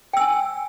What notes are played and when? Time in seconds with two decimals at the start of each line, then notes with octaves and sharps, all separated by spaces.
0.13 G5
0.17 E6
0.20 G#5